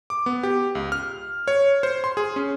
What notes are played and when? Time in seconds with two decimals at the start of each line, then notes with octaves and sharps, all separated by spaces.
0.10 D6
0.26 B3
0.43 G4
0.75 C#2
0.92 F6
1.48 C#5
1.83 C5
2.04 C6
2.17 G#4
2.36 C#4